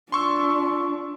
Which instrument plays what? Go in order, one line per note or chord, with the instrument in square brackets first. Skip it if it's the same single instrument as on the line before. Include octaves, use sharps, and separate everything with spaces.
[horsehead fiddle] D4 F4 [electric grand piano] C6 C#6 E6